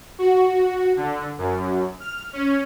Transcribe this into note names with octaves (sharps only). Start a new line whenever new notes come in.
F#4
D3
F#2
F6
C#4